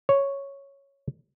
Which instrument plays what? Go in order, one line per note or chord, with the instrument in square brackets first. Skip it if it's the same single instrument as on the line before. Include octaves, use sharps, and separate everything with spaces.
[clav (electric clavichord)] C#5